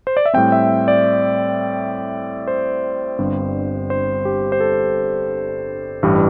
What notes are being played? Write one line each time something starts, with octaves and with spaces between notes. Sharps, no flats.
C5
D5
E5
A2 G3 C4 G5
E5
D5
C5
G1 G2 G3 C4
C5
G4
C5
A4
A1 G2 E3 G3